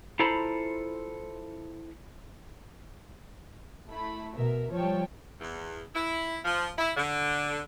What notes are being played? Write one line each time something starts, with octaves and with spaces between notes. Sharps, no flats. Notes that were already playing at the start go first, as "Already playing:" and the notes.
E4 F4 A4 C5 A#5 B5
A3 E4 B5
B2 A#4 E5
F3 G3 C#5 G5 A5
E2
E4
F3
E4
D3